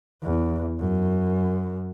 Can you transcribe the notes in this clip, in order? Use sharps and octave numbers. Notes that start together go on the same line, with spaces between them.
E2
F#2